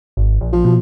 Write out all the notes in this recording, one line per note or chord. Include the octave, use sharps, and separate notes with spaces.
G#1
A#1
F3
B2